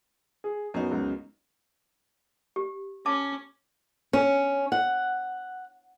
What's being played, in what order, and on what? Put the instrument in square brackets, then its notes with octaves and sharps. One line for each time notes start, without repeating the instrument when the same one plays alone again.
[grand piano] G#4
[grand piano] F#2 [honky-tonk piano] B3 D#4
[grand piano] C#2 F#2
[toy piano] G4
[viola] C#4 [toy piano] A5 D6
[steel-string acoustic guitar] C#4
F#5